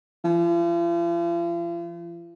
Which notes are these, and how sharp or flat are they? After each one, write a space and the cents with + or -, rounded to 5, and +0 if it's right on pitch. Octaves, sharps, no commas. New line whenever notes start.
F3 -45